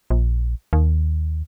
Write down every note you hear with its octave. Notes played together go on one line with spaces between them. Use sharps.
A#1
D#2